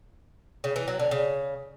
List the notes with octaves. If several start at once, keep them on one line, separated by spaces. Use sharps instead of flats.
C#3
E3
F#3
D3
C#3